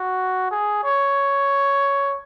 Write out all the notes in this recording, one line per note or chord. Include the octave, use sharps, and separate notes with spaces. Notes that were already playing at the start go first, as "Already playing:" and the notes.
Already playing: F#4
G#4
C#5